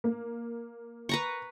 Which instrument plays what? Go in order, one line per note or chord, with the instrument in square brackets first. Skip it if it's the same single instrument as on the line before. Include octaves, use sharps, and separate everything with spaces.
[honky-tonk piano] A#3
[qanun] B4 A#5 C#6